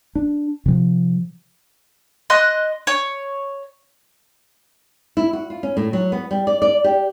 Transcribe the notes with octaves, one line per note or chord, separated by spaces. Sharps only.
D4
C3 F3
D#5 C6 F#6
C#5
E4
F#4
F4
C#4
A2
F#3
B3
G3
D5
D5
G4